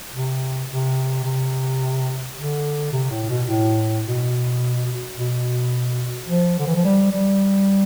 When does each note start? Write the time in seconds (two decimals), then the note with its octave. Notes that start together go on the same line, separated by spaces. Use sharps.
0.14 C3
0.69 C3
1.24 C3
2.37 D3
2.93 C3
3.11 A2
3.29 B2
3.48 A2
4.05 B2
5.17 B2
6.28 F3
6.59 D3
6.67 E3
6.76 F3
6.85 G3
7.12 G3